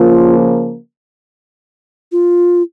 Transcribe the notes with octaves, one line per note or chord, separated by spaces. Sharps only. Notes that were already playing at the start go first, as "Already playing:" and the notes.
Already playing: C#3 F3 A#3 F4
F4